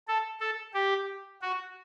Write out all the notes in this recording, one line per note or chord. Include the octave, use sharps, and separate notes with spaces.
A4
A4
G4
F#4